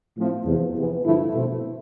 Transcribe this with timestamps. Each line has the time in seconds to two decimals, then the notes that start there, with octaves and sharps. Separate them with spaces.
0.18 A2 F3 C4 E4
0.46 E2 C3 F3
0.76 E2 C3 E3 B3
1.04 G2 D3 F3 A3 E4
1.34 B2 A3 C4 E4